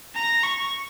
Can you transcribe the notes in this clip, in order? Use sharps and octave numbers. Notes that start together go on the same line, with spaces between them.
A#5
C#6